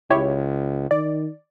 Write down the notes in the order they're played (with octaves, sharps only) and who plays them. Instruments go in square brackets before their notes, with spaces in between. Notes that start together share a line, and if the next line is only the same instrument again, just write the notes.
[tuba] C#2 [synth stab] E4 G4 C#5
[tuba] D#3 [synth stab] D5